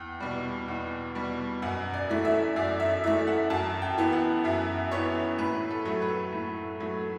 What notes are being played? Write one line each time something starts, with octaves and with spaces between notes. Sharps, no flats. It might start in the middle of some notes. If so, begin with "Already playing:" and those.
Already playing: E2 G5
B2 G3
E2
B2 G3
F#2 F#5
D5
E3 A3
E5
F#2 D5
E5
E3 A3 E5
F#5
F#2 A5
G5
E3 B3
F#5
F#2 E5
E3 B3 C#5
A2 B4
A4
F#3 A3
B4
A2
F#3 A3